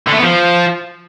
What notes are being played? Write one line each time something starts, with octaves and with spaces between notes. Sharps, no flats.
D3
A3
B3
F3